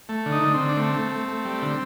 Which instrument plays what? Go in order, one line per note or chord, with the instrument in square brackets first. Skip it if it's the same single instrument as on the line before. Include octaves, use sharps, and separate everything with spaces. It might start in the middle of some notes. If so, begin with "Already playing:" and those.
[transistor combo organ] A3
D3
D#4
D3
C4
D3
D4
A3 C4
A3
A3
A3
G3
D3